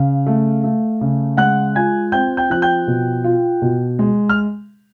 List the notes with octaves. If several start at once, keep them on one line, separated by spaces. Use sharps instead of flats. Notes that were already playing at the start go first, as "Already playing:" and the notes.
Already playing: C#3 F5
A3
A3
C#3
G#3 F#5 F#6
F4 G#5 G#6
C4 G5 G6
G5 G6
F3 F#6
G5 G6
B2
F4
B2
G#3
F6